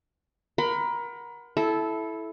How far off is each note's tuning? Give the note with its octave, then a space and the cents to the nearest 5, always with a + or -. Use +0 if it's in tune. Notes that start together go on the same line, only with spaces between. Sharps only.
A#4 +30 F#5 +0 B5 +35
E4 +0 A4 -15